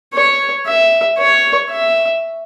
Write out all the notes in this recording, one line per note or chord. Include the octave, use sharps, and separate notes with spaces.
C#5
E5
C#5
E5